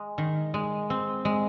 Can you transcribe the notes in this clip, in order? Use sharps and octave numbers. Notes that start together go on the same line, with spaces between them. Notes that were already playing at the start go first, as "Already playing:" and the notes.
Already playing: G#3
D#3
G#3
C4
G#3